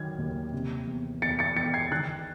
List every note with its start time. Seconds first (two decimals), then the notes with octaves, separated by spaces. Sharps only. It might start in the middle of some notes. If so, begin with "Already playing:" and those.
Already playing: D#3 F#3 G#6
0.18 D#2
0.53 C3
0.87 E2
1.22 E2 A6 C#7
1.39 A6 C#7
1.56 E2 A6 C#7
1.74 G#6 C7
1.91 D#3 F#6 A6